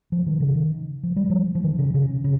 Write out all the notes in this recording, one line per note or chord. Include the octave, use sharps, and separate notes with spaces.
F3
D#3
C#3
D#3
F3
G3
F3
F3
D#3
C#3
C#3
C#3